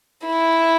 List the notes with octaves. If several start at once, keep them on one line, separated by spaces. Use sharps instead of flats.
E4